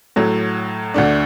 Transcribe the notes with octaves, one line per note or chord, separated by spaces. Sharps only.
A2 F#3 A3
D2 D3 A3 D4